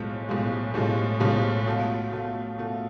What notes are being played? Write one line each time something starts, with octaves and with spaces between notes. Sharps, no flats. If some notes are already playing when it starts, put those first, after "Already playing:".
Already playing: B1 A2 F3 G#3
B1 A2 F3 G#3
B1 A2 F3 G#3
B1 A2 F3 G#3
B2 A3 F4
B2 A3 F4
B2 A3 F4